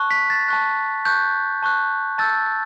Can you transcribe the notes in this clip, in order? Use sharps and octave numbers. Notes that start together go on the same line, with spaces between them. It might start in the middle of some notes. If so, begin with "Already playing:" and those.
Already playing: A5 C#6 F#6
B6
A6
A5 C#6 F#6
A5 C#6 F#6 G6
A5 C#6 F#6
A5 E6 G6 A6